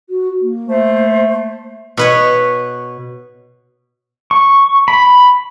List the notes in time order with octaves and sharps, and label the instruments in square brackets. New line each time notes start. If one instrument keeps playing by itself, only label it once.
[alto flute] F#4
A#3
[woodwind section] A3 C5
[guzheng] B2 B4 C#5
[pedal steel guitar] C#6
B5